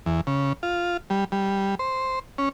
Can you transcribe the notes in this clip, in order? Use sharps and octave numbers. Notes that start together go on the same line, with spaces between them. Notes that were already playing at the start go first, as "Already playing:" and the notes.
E2
C#3
F4
G3
G3
C5
C#4